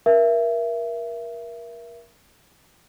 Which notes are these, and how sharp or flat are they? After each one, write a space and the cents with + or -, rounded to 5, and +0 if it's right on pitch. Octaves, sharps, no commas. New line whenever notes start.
A#4 +25 E5 +25